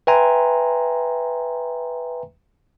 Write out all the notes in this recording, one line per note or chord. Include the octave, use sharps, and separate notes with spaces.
B4 E5 G5 G#5 A#5 C6